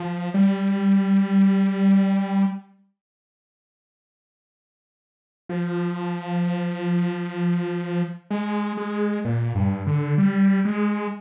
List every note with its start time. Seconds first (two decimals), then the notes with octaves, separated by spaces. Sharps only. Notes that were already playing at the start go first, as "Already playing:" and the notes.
Already playing: F3
0.34 G3
5.49 F3
8.30 G#3
8.77 G#3
9.25 A#2
9.55 G2
9.87 D3
10.18 G3
10.65 G#3